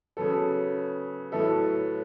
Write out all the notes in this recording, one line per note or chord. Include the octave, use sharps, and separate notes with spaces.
C#3 F#3 B3 A4
A2 F#3 B3 A4 E5